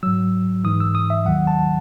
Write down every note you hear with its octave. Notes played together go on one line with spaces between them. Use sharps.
G#2 F#3 E6
G#2 E3 D#6
E6
D#6
E5
D#2 D#3 F#3 F#5
A5